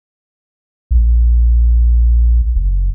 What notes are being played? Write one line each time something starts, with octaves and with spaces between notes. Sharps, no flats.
A#1
F#1